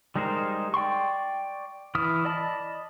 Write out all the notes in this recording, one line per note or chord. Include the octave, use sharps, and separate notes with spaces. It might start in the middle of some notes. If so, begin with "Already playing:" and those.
G3 G#3 D#4 A#4 C5
D5 G5 C6 C#6
E3 E4 D#6 F6
D5 D#5 A5 B5